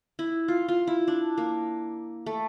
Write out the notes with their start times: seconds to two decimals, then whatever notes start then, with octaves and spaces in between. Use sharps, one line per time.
0.19 E4
0.48 F4
0.68 F4
0.87 E4
1.08 D4
1.38 A#3
2.26 A3